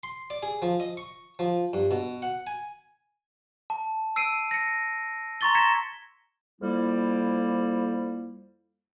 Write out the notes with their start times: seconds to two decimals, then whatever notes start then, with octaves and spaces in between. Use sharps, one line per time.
0.03 C6
0.30 D5
0.43 G#4
0.62 F3
0.80 D#5
0.97 C#6
1.39 F3
1.73 G2
1.91 B2
2.22 F#5
2.47 G#5
3.70 A5
4.16 E6 C7 D7 D#7
4.51 A#6 C#7
5.41 A#5 C6 C#6 A6 G7
5.55 G#6 A#6 B6 C#7 E7 G7
6.61 F2 G3 A#3 E4